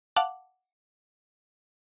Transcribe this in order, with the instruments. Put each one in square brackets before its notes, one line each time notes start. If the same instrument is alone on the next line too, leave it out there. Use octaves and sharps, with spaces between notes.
[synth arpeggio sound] F5 F#5 A5 D6